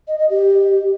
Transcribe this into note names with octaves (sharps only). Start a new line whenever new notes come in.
D#5
D#5
G4